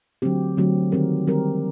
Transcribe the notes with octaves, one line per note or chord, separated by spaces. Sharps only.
D3 F#3 A3 C4 G4
D3 F#3 A3 C4 G4
D#3 G3 C4 G4 A#4
D#3 G3 C4 G4 A#4